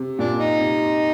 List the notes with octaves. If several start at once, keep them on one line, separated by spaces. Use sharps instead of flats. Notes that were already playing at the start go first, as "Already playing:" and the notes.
Already playing: C3
A#2 D4
D#4
C3